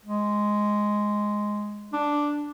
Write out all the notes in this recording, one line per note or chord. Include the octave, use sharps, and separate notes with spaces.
G#3
D4